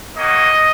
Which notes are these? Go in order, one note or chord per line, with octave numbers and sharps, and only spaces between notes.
A#3 C#4 F#4 D#5